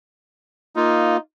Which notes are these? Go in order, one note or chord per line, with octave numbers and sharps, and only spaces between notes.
A#3 D#4 F4